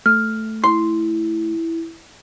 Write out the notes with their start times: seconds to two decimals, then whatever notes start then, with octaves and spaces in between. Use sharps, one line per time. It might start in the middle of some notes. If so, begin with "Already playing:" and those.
0.06 A3 F6
0.64 E4 C6